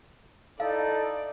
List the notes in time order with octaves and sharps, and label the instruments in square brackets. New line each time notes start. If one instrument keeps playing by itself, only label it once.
[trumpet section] D#4 E4 [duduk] A4 [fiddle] D5 [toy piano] F5